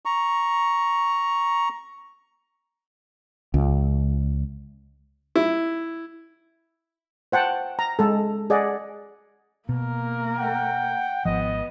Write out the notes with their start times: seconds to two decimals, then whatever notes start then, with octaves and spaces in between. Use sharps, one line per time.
0.05 A#5 C#6
3.54 C#2
5.36 E4
7.32 C5 F#5 G5 A5
7.79 A#5
7.99 G#3 A4
8.50 G#4 D5 D#5 F#5
9.69 B2 A#3 A#4
10.39 F#5 G5
11.25 G#1 F3 B3 D#5